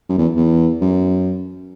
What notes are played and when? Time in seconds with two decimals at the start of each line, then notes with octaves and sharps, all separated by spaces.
0.09 F#2
0.18 E2
0.36 E2
0.81 F#2